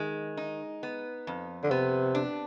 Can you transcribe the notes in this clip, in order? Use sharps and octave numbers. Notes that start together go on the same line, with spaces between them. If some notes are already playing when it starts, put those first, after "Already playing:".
Already playing: D#3 G#3
D#4
B3
F2
D3
C3 B3
D4